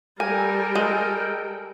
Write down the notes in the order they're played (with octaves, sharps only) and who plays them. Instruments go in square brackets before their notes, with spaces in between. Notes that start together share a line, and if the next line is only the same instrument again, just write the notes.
[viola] G3 [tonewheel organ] A4 G5 [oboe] A#4 [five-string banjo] G#5
[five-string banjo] G#3